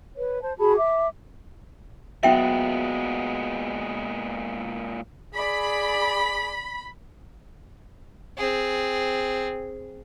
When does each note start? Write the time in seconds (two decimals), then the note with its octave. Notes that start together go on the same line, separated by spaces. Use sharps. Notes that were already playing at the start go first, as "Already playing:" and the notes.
0.16 B4 C#5
0.42 C5 A5
0.59 F#4 G#4 A5 B5
0.76 E5 D6
2.23 A#2 F#3 G#3 B3 E5 G5
5.36 G#4 D5 B5
8.37 C4 G#4